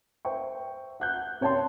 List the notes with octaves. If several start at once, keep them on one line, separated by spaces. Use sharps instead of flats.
C5 E5 G5 C#6
F#5 F#6 G6
C3 C#5 G5 A5 C6